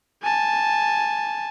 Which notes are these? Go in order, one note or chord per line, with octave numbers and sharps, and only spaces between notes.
G#5 A5